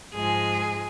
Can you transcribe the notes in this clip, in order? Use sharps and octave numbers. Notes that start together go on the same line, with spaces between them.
G#2 F3 G#3 G#4